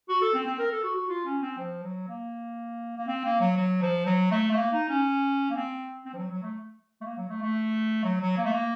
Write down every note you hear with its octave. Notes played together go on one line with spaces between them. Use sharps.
F#4
A4
C4
C4
A#4
A4
F#4
F#4
F4
C#4
C4
F3
F#3
A#3
A#3
C4
A#3
F#3
F#3
F3
F#3
A3
A3
A#3
D#4
C#4
A#3
C4
C4
F3
F#3
F#3
A3
A3
A#3
F#3
A3
A3
F#3
F#3
A#3
A3
A#3